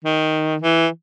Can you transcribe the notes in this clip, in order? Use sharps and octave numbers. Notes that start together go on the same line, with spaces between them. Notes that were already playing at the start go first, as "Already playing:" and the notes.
D#3
E3